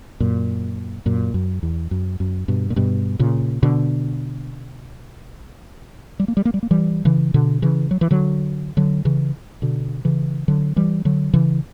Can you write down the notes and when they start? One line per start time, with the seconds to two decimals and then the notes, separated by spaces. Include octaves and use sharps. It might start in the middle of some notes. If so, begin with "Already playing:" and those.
0.20 F#2 A#2
1.06 F#2 A#2
1.34 F#2
1.63 E2
1.91 F#2
2.20 F#2
2.48 G2 B2
2.70 A#2
2.76 G2 B2
3.19 A#2 C#3
3.63 B2 D3
6.20 G3
6.28 A#3
6.37 G3
6.45 A#3
6.54 G3
6.63 A#3
6.71 E3 G3
7.05 C#3 E3
7.34 B2 D3
7.62 C#3 E3
7.91 F#3
8.01 E3
8.11 D3 F#3
8.77 D3 F#3
9.05 C#3 E3
9.62 B2 D3
10.05 C#3 E3
10.48 D3 F#3
10.76 E3 G3
11.05 D3 F#3
11.34 C#3 E3